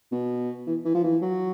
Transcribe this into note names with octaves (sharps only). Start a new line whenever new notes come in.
B2
E3
E3
F3
E3
F#3